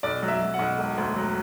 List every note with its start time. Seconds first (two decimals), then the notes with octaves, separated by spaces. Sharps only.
0.03 B1 D5
0.22 F#3
0.28 E5
0.40 F#3
0.54 F#5
0.59 B1
0.78 E1
0.98 D2
1.16 F#3